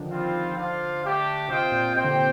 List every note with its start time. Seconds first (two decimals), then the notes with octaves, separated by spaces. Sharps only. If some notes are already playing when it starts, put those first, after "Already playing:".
Already playing: D3 D#3 F3
0.10 G3 C4 F4
0.56 D4 F4 C5 F5
1.02 A3 D4 G4
1.48 C3 F4 C5 D#5 G5
1.72 A#2
1.94 C3 C4 G4 C5 G5
2.05 D3
2.15 C3